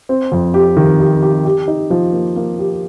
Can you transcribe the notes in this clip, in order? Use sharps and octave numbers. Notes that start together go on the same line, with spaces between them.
C4
F2
G4
D#3
G4
G4
G4
D#4
F3
A#3
A#3
G4